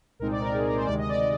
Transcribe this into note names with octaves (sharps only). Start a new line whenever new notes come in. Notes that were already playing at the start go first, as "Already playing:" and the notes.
C2 A#2 G#3 C4 D#4 A#4
D5
A#4
G#4
A#4
C5
D2 C3 D#3 G#3 D5
D#5
D5